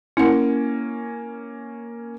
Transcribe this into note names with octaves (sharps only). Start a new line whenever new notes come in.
A#3 C#4 E4 F#5